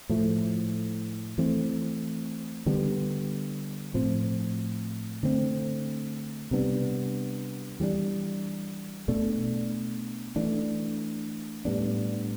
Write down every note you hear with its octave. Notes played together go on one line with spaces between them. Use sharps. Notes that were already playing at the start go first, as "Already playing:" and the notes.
A2 F3 A3
E3 A3 C4
D3 G3 B3
A2 F3 C4
D3 A3 C4
C3 G3 B3 D4
E3 G3 B3 D4
B2 A3 D4
E3 A3 D4
A2 G3 B3 D4